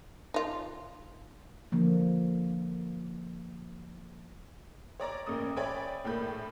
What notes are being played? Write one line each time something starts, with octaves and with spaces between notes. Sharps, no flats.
D#4 F4
D3 F3 A#3
C#5 D5 A#5 D6
A1 A#3 C#4 D#6
C#5 D5 E5 G5 G#5 B5
A#1 A2 A#3 B5 G6